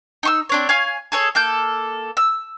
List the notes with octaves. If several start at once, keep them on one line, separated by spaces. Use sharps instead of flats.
D#4 C#6 E6
C4 D4 C#5
C#5 F5 G#5
G#4 A4 C#5
A#3 A4 G6
E6